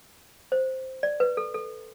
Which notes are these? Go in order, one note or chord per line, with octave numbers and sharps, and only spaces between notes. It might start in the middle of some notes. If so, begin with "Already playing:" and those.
C5
D5
B4
A4
A4